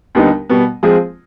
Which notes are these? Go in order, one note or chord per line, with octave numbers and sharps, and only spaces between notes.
D#2 D3 G3 B3 D#4
B2 G3 B3
F3 G#3 C4 F4 G#4